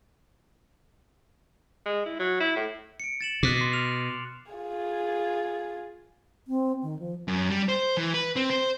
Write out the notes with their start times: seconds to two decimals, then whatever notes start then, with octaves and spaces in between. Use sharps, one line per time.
1.86 G#3
2.06 E4
2.19 F#3
2.40 E4
2.56 A2
3.00 C#7 D7
3.21 A6 E7 F#7
3.43 B2 D6 F#6
3.57 C6 C7
3.73 F6 F7
4.52 F4 G#4
6.47 C4
6.83 D#3
6.99 F3
7.28 F#2
7.49 G3
7.69 C5
7.97 E3
8.14 B4
8.36 C4
8.50 C5